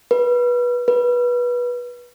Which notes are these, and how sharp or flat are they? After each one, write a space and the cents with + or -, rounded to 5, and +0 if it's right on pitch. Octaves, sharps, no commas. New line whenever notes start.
B4 -20
B4 -20